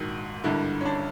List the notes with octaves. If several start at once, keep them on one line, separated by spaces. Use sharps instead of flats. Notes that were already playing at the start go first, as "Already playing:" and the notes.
Already playing: A#1 G#2 D#3 F#4
G#1 G2 D3 E4
C#4
D4